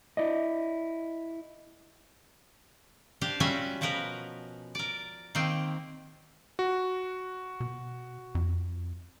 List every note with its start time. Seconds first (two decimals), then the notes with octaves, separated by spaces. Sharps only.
0.17 E4 D5 D#5
3.21 D4 G4 C5 F5
3.40 G3 C#4 F4 F#4 E5 G#5
3.81 B2 F3 F#4 A#4 B4
4.75 A#4 D5
5.35 D#3 A#3 C4
6.59 F#4
7.60 B2
8.35 F2